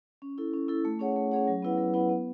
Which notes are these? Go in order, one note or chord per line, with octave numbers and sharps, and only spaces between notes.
C#4
E4 A4
C#4
E4 A4
A3
C#4 G#4 C#5 F#5
A3
C#4 G#4 C#5 F#5
F#3
B3 E4 B4 F#5
F#3
B3 E4 B4 F#5
B3